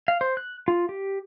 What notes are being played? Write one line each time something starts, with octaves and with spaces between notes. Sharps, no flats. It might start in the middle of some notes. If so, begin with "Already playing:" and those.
F5
C5
F#6
F4
G4